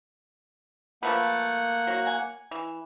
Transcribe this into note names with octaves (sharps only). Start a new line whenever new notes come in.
F3 A3 A#3 B4 F#5
F#3 F#4
G#5
E3